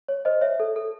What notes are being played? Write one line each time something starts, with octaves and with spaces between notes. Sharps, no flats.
C#5
C5 D#5
C#5 E5
A4
A4